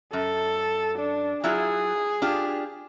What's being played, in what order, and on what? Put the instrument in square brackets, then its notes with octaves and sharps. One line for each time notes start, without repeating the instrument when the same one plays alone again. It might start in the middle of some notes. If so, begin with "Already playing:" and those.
[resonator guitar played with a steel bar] F#2 [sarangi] A4
[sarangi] D4
[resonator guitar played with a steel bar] F#3 E4 F4 [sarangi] G#4
[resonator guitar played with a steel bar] D4 F4 G4